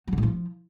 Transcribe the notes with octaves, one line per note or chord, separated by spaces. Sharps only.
F#3
D3
A2
F3